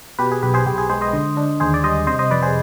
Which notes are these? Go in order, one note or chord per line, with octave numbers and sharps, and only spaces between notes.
B2 G4 B4
G#4
B1 G4 B4
G#4 C5
B1 G4
G#4
G#3 G#4 C5
C5 D#5
D3
D4
D#2 G#4 C5
D5
G3 C5 D#5
C3 C5 D#5
C5 D#5
F2 B4 D5
G#4 C5